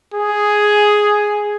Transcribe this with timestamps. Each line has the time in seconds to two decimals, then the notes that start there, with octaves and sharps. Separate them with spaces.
0.14 G#4